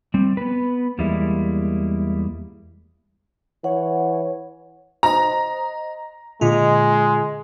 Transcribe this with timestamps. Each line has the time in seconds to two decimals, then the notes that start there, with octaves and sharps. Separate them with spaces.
0.14 G3 C4
0.37 B3 B4
0.98 E2 G3 G#3 A#3 E4
3.64 E3 C#5 F#5
5.03 C5 D#5 A#5
6.41 A#2 D3 G#3 F4